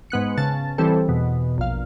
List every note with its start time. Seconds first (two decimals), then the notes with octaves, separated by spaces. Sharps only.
0.10 G#2 B3 F#6 C#7
0.37 C#3 A5
0.78 E3 G3 C4 A4
1.08 E2 B2
1.58 A#1 F5